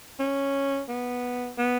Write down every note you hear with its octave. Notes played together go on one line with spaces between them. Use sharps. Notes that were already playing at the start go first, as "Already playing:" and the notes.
C#4
B3
B3